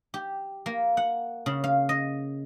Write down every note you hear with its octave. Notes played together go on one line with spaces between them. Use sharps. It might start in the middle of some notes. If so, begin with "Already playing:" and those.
G4
A#3
F#5
C#3
F5
D#5